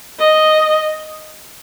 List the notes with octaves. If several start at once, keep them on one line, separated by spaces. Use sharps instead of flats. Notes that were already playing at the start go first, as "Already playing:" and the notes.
D#5